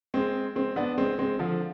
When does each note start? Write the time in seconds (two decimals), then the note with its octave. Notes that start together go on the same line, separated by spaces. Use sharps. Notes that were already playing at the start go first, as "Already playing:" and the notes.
0.14 G#3 C4
0.55 G#3 C4
0.76 B3 D4
0.98 G#3 C4
1.19 G#3 C4
1.39 D3 F3